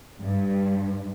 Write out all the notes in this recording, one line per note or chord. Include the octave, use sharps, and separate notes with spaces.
G2